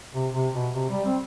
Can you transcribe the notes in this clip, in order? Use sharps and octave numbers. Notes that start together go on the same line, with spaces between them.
C3
C3
B2
C3
G3
C4